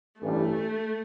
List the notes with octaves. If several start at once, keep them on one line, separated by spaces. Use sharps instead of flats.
A1 G2 E3 G3 A3